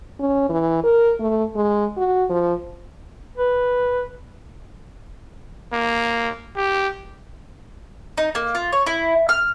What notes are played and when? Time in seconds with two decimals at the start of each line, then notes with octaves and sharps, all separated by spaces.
0.20 C#4
0.49 E3
0.84 A#4
1.20 A3
1.56 G#3
1.97 F#4
2.30 F3
3.37 B4
5.73 A#3
6.57 G4
8.18 D#4
8.35 A#3
8.55 F4
8.72 C#5
8.87 E4
9.29 F6